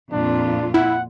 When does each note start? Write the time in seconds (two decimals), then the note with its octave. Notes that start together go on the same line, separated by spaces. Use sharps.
0.12 F2 A#2 D4 F4
0.74 E4 F#5